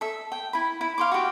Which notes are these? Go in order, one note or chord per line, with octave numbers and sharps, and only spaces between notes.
A4 E5
G5
E4 B5
E4
F5 C6 D6
F#4 G4